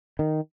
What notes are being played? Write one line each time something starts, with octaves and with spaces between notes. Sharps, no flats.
D#3